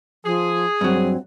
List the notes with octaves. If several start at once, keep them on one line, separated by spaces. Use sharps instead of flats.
F3 G#4
G2 F#3 C4